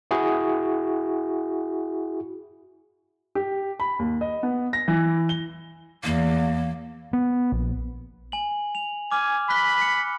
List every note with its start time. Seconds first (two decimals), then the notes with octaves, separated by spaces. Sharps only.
0.11 E4 F#4 G#4
3.35 G4
3.80 B5
3.99 D#2
4.21 D#5
4.43 B3
4.73 A#6
4.88 E3
5.29 G7
6.04 E2 A#3
7.13 B3
7.52 A#1
8.32 G#5 F#7
8.75 F7
9.12 G#5 D6 F6
9.50 B5 F#6 B6 G7
9.82 C#7